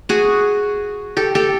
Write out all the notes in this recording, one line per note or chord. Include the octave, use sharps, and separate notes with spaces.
F#4 G#4
G4 A4
G4 A4